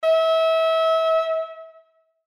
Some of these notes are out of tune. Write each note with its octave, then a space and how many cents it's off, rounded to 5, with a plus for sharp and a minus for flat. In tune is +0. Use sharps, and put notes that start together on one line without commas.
E5 -30